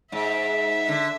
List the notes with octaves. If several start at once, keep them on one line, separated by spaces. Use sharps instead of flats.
G#2 E5
D3